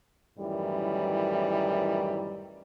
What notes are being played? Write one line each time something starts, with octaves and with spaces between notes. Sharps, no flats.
F#2 A2 D#3 E3 G3